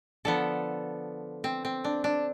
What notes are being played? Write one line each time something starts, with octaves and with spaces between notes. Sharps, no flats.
D3 F3 B3 A4
C4
C4
D4
D4